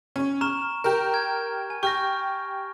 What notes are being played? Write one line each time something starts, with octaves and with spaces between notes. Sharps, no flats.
C#4
A#5 C#6 F6 E7
G4 A#4
F6 G#6
G#5
G4 C#6 F6 A#6